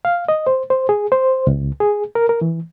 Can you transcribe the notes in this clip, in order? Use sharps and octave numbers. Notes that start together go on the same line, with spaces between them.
F5
D#5
C5
C5
G#4
C5
C#2
G#4
A#4
A#4
E3